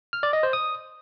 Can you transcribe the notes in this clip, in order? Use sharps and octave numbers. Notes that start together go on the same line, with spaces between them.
F6
D5
D#5
C5
D#6